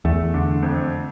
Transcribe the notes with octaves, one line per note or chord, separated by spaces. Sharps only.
E2 A3
D3
F2